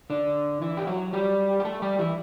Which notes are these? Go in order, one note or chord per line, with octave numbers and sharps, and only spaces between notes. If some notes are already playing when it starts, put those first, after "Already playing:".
D3 D4
E3 E4
G4
F#3 F#4
G3 G4
G4
A3 A4
G3 G4
E3 E4